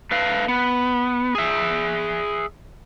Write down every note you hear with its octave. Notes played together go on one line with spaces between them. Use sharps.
A3 B4 F5
B3
G#4 E5